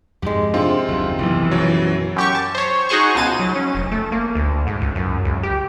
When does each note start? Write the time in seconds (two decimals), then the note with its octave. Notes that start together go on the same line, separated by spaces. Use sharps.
0.22 F2 G#2 G#3 G4
0.54 G#2 C3 C4 D4 F4
0.88 F#1 D#2
1.18 F1 B1 E3
1.51 F#2 B2 F#3
2.16 F#2 G4 C#6
2.35 A5
2.55 C5 C#5
2.89 D#4 F#4 G#4 C5 C#6
3.15 C#2 B2 A6 D#7
3.39 F#3
3.56 C#4
3.75 F1
3.91 A3
4.12 A#3
4.35 D2
4.67 G#2
4.81 C#2
4.95 F#2
5.25 C#2
5.43 G4